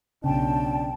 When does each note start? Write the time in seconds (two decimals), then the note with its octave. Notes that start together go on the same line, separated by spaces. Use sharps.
0.24 B1 C#3 D4 G5 A5